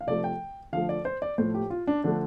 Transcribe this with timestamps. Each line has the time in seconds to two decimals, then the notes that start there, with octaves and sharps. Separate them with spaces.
0.01 F5
0.07 C3 F3 A3 D5
0.24 G5
0.73 D3 F3 A3 F5
0.89 D5
1.05 C5
1.22 D5
1.38 A2 F3 A3 C5
1.54 G4
1.70 F4
1.87 D4
2.04 D3 F3 A3 D4